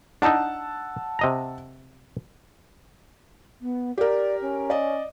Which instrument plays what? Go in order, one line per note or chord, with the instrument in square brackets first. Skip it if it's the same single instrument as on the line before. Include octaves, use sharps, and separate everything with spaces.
[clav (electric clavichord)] D4 D#4 [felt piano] F#5 A5 E6
[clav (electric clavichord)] C3 D#5 A#5
[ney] B3
[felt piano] G4 A#4 [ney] D5
[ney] C#4
[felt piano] D5 D#5